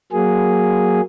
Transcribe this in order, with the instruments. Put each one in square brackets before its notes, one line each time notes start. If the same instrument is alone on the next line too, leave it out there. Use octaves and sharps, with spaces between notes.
[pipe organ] F#3 A#3 G#4